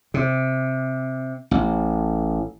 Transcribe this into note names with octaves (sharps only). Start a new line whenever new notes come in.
C3
A1